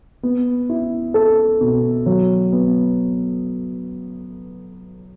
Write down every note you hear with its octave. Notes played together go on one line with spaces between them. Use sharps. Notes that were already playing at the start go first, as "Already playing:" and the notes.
B3
E4
A4
B2
F#3
B3